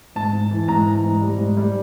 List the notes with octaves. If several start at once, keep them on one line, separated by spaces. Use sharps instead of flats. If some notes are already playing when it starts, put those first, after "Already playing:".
G#2 A5
G#2
E3
G#2 A#5
E3
G#2
G3
G#2
G3